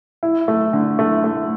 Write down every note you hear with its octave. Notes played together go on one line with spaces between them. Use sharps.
E4
A3
D3
A3
A3